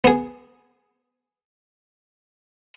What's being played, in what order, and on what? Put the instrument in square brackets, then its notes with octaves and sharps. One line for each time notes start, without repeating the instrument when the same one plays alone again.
[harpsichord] B3 G#4